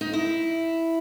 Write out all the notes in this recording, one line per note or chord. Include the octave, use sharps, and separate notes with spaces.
D#4
E4